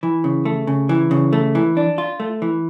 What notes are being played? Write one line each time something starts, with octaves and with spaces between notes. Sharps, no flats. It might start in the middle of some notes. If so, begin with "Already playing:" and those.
E3
C#3
A3
C#3
E3
C#3
A3
E3
D4
F4
A3
E3